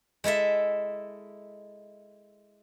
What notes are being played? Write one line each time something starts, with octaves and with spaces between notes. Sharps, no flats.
G#3 E4 A4 E5